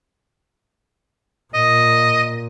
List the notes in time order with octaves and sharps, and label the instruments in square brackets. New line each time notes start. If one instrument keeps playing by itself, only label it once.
[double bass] A#2 [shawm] D#5